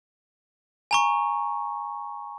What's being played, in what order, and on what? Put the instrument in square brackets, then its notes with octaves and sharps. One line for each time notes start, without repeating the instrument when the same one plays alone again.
[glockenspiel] G#5 A#5 C#6